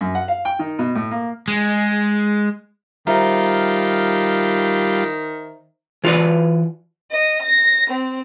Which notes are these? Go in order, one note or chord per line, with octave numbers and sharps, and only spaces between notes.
F#2
F#5
F5
G5
D#3
B2
A2
A#3
G#3
D#3 G3 F4 C5 E5 A#5
E3 F4 F#4 B4 D5
D#5
A#6
C4